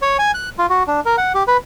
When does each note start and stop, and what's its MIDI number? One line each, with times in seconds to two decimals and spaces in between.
0.02 0.17 73
0.19 0.32 80
0.34 0.49 90
0.58 0.66 65
0.70 0.83 66
0.88 1.00 62
1.05 1.16 70
1.18 1.33 78
1.34 1.43 67
1.48 1.57 71